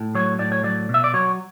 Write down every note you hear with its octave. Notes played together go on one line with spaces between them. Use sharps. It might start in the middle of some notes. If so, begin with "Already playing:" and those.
Already playing: A2
F#3 C#5
A2 D5
C#5
F#3 D5
B2
E5
D5
F#3 C#5